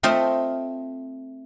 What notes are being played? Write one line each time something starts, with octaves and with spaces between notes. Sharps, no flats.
A3 C4 F4 C5 D#5 E5